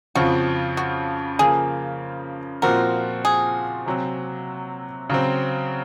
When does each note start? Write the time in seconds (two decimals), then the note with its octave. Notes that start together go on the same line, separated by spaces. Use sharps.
0.15 F2 C#3 F3 F#4
0.77 F#4
1.39 C#3 F3 A#3 G#4
2.62 A#2 F3 C4 F#4 A#4
3.25 G#4
3.86 C3 F#3 C4
5.10 C#3 F#3 C4